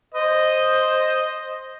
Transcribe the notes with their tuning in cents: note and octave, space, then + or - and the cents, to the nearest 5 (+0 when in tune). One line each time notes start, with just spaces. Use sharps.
C5 +5 D#5 +0